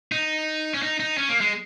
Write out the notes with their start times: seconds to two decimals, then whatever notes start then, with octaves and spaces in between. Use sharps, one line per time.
0.12 D#4
0.74 C#4
0.82 D#4
1.00 D#4
1.18 C#4
1.29 A#3
1.41 G#3